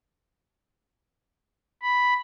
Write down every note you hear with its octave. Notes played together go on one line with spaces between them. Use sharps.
B5